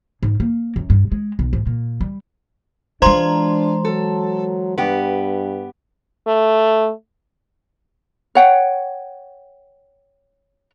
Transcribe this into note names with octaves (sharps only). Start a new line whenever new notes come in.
G#2
A#3
F#2
G2
G#3
B1
G#2
A#2
G3
E3 G#3 D4 F4 C5 A#5 C6
F#3 A4
G2 B3 G4
A3
C#5 F#5 G5